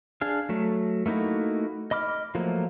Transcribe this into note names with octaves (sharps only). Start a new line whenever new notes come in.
D4 G#4 F5
F#3 A3
A3 A#3 D#4 E4 F#4
D#5 B5 D6 F6
F3 F#3 A3 A#3